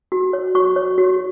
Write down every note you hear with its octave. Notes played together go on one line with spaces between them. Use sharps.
F#4
C#5
F#4 C#6
C#5
F#4